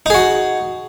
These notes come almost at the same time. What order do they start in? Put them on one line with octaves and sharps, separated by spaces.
D#4 G#4 F#4